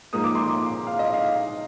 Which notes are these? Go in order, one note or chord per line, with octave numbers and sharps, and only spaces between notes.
G#2 F3 A#3 D#6
D6
C6
D6
F5
D#5
F5